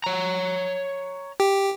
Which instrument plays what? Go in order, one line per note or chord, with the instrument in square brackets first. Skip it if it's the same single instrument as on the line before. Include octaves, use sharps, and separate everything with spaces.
[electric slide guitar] C#5 A#5
[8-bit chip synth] G4